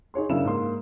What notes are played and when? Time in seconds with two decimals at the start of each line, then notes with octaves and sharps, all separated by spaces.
0.14 D#4 G#4 C#5 C6
0.29 F#2 C#3 D4 E4 A#4 E7
0.45 G#2 A#3 C6